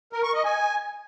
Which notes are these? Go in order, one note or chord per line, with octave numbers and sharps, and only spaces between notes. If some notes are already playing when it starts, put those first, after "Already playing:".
A#4
C#6
D#5
G#5